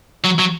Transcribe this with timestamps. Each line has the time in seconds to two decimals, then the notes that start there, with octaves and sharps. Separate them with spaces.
0.24 F#3
0.39 F#3